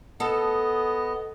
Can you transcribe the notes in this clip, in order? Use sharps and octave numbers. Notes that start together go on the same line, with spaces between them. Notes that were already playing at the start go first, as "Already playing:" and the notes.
B3 A4 D#5